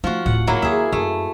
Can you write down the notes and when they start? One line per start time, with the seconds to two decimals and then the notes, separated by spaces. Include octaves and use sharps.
0.04 F3 A3 D#4 F#4
0.26 D1 A2 F#5
0.47 F#3 A#3 E4
0.62 D#2 G#4 E5
0.92 F#2 A3